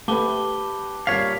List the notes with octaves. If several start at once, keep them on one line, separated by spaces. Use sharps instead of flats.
A3 G4 B4 A5 D6 G7
A#2 G3 A#4 C#5 F5 B6